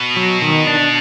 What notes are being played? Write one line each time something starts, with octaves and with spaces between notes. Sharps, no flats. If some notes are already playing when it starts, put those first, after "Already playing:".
Already playing: B2
F#3
D#3
D4